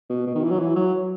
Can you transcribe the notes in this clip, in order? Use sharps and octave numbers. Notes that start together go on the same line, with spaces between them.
B2
B2
D#3
E3
F#3
E3
F#3